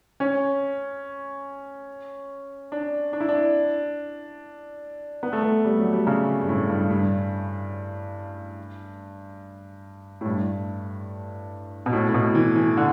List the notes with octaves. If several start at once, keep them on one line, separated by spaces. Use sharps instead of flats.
C#4
D4
D4
E4
D4
B3
A3
B3
G3
F#3
G3
C#3
G2
A2
G2
G2
A2
G2
B2
A2
A2
B2
E3
E3
D3